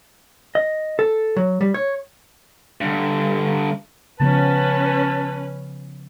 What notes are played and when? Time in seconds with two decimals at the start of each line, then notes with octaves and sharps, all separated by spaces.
0.55 D#5
0.99 A4
1.36 F#3
1.61 G3
1.74 C#5
2.81 G2 D3
4.20 C#3 F3 B3 C#4 B4 A5